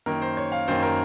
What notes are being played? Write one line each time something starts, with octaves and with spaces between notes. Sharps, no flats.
F#2 D#3 A#3 A#4
C5
C#5
F5
F#2 D#3 A#3 C5
A#4